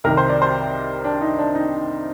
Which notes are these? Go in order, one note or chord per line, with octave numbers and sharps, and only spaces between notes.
C2 C3 D#3 A#4
C5
D5
C5
D4
D#4
D4
D#4